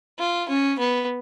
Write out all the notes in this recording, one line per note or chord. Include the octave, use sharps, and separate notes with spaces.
F4
C#4
B3